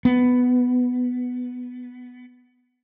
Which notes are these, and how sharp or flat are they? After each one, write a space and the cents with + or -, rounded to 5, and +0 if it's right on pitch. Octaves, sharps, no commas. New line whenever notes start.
B3 +5